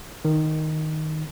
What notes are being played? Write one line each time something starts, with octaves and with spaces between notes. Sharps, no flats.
D#3